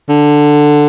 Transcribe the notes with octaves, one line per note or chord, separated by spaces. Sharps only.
D3